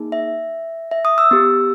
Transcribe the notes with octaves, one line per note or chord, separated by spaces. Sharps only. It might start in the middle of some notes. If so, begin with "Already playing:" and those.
Already playing: A#3 D#4 G#4
E5
E5
D#6
E6
B3 G4